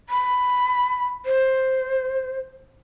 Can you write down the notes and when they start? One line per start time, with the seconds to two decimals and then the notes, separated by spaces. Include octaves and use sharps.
0.09 B5
1.26 C5